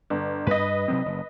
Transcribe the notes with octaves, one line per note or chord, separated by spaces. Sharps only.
G1
G2 B4 D#5
C3 F#3 C4
F#1